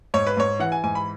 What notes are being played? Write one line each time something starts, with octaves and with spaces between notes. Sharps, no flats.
G#2 C#5
B4
G#2 C#5
E3 F#5
G#5
G#2 G#5
B5